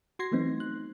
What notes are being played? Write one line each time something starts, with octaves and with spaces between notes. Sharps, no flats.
F#4 C6 G#6 A#6 C7
E3 F#3 A3 B3 C4 D#4
F#6